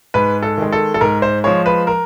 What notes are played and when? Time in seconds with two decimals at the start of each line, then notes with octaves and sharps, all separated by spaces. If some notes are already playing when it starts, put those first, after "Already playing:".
0.14 G#2 B4
0.43 A4
0.58 D#3 G#3
0.72 A4
0.94 A4
1.01 G#2 A#4
1.22 C5
1.44 F3 G#3 C#5
1.66 B4
1.87 A#4